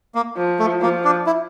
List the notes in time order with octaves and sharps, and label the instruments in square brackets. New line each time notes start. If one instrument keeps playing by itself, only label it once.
[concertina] A#3
[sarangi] F3
[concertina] A3
[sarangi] F3 [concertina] A#3
[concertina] D4
E4